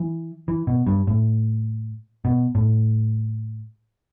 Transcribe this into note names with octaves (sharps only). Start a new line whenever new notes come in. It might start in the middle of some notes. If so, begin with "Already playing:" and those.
Already playing: E3
E3
B2
G2
A2
B2
A2